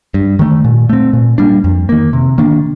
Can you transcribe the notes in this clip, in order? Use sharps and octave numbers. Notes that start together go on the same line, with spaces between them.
G2
D#3 A3
A#2
A3 C4
A#2
G3 A#3 D4
F2
D#3 A#3
C3
D#3 A#3 D4